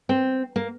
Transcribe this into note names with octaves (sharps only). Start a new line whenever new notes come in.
C4
A#3